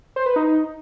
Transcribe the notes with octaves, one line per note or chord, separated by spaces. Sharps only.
C5
B4
D#4